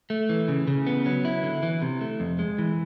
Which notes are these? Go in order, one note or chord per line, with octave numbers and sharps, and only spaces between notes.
A3
E3
C#3
C#3
B3
F#3
E4
D3
E3
C3
A3
F2
G#3
E3